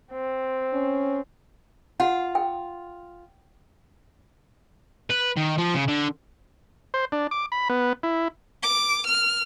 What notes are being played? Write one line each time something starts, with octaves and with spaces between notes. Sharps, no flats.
C4
C#4
F4 F#5
G5
B4
D#3
F3
C#3
D3
C5
D4
D6
B5
B3
E4
D6
F6